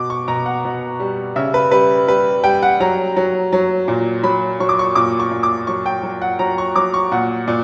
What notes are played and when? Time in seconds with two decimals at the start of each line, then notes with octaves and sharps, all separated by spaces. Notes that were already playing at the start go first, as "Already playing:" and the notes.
Already playing: B2 D6
0.10 C#6
0.28 B2 A#5
0.46 F#5
0.65 B2
1.00 G3
1.36 C#3 E5
1.54 B4
1.71 G3 B4
2.08 G3 B4
2.43 G3 G5
2.63 F#5
2.80 F#3 A#5
3.17 F#3
3.53 F#3
3.88 A#2
4.23 F#3 B5
4.60 F#3 C#6
4.69 D6
4.79 C#6
4.95 A#2 D6
5.20 C#6
5.31 A#2
5.43 D6
5.67 F#3 C#6
5.86 G5
6.03 F#3
6.22 F#5
6.39 F#3 A#5
6.58 C#6
6.76 F#3 D6
6.94 C#6
7.11 A#2 F#5
7.48 A#2 D5